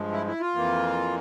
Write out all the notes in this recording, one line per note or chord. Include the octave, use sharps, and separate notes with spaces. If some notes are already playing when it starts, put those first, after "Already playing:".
Already playing: G2 F3 G#3
E4
E4
F4
F2 E3 A#3